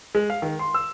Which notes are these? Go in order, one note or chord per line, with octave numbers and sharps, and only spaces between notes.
G#3
F5
D#3
C6
E6